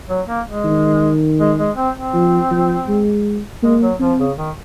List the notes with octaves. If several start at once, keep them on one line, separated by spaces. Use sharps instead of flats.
F#3
A#3
G#3
D#3
G#3
G#3
C4
C4
F3
F3
G#3
G#3 A#3
F#3
F3 C4
C#3
D#3